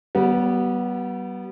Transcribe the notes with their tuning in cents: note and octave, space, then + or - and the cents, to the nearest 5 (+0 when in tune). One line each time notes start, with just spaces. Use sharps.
G3 -40 B3 -15